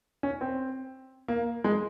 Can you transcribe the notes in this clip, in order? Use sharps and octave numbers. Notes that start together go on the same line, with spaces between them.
C#4
C4
A#3
G#3